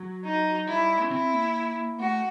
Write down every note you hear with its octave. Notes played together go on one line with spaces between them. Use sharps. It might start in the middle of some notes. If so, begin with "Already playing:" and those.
Already playing: F#3
D#4
G3 E4
C#4
C4 E4
A#3
A3 F#4